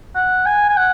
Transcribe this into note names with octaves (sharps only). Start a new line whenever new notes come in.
F#5
G#5
G#5
F#5